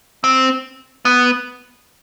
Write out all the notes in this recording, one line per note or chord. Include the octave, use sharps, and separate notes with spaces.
C4
B3